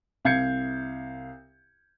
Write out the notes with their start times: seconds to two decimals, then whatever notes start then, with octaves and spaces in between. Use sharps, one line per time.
0.25 C2 F5 G6 G#6 C#7